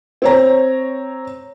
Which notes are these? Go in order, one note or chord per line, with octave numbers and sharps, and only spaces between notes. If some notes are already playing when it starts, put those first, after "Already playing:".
C4 C#5 A#5